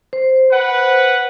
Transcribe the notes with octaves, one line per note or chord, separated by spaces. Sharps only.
C5
B4 F#5